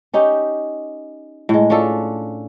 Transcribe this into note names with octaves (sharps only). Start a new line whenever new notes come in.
C#4 D#4 G4
A2 G#3
C#4 D4 F4 A4